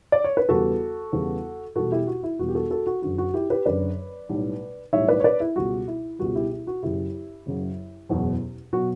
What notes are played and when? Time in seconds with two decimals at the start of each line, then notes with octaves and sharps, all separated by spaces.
0.12 D5
0.24 C#5
0.37 B4
0.49 E2 C#3 G3 B3 F#4 A4
1.13 E2 C#3 G3 B3
1.76 E1 E2 B2 G3 F#4 A4
1.92 E4 G4
2.07 F#4
2.23 E4
2.39 E1 E2 B2 G3 F#4
2.48 G4
2.55 F#4 A4
2.70 F#4 A4
2.87 F#4
3.02 F#1 F#2 D3 F#4
3.18 F#4
3.34 E4 G4
3.50 G4 B4
3.66 F#1 F#2 D3 B4 D5
4.29 B1 A2 G3
4.93 B1 A2 G3 C#5 E5
5.08 B4 D5
5.20 C#5
5.24 B4 D5
5.40 E4
5.56 C#2 B2 G3 F#4
5.88 E4
6.19 C#2 B2 G3 F#4
6.35 E4 G4
6.51 E4
6.67 F#4
6.83 F#1 F#2 C#3 F#3 E4 G4
7.46 F#1 F#2 C#3 F#3
8.09 F#1 E2 B2 F#3
8.73 B2 F#3 F#4